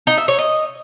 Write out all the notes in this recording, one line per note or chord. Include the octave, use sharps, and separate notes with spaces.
D#4
E5
C#5
D#5